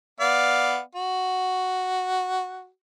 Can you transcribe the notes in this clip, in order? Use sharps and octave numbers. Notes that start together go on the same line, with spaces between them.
B3 D5 F5
F#4